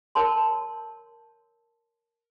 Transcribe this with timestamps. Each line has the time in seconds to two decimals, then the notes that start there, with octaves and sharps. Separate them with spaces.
0.15 A#4 C#5 A5 C6